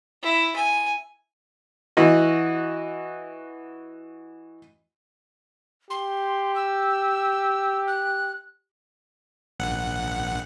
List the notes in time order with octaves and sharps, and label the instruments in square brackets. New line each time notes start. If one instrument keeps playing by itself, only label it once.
[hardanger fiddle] E4
G#5
[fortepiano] E3 F#4 D#5
[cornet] G4 [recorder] C6
[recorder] E6
F#6
[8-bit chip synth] A#1 F#5